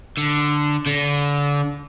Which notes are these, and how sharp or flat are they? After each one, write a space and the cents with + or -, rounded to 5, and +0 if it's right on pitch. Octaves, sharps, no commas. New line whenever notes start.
D3 +5
D3 -30